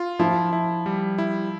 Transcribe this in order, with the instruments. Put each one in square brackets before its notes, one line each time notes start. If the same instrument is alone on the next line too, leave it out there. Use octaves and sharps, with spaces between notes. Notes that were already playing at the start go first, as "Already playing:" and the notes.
Already playing: [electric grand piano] F4
[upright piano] F3 [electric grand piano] E4
[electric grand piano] E4
G3
E4